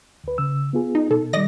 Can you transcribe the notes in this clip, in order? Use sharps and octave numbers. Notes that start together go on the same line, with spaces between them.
D2 B4
C#3 E6
B3 F4 G#4
D#4
B2 A4
D#3 G3 D5 D#5 A#6